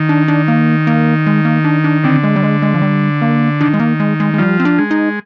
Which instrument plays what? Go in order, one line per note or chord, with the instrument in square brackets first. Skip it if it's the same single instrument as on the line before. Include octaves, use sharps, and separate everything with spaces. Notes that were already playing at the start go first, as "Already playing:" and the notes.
Already playing: [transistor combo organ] D#3
[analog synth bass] D4
D4
A#3
A#3
G#3
A#3
D4
D4
[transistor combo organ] D3 [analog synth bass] C4
[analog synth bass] G#3
G3
G#3
G#3
F3
G3
A#3
[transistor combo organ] D#3 [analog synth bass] D4
[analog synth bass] G#3
A#3
G#3
G#3
G#3
[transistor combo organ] F3 [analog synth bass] G3
[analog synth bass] C4
D4
[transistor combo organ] G#3
[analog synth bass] D#4